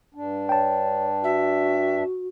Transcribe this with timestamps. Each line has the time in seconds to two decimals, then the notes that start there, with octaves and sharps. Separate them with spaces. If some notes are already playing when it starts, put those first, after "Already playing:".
0.15 G2 D4
0.49 C#5 G5 A5
1.23 F#4 E5